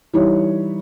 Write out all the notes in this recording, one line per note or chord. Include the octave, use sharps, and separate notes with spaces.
E3 G3 D#4 E4 C#5